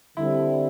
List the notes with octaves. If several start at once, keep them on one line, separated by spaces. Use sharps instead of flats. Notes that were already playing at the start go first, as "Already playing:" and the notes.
D3 G3 C4 E4